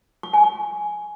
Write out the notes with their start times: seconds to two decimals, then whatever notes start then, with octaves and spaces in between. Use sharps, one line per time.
0.23 C#6
0.33 G#5
0.43 C#6